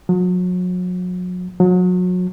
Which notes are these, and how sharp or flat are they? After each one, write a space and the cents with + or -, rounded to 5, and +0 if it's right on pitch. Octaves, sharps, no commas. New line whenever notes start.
F#3 -35
F#3 -30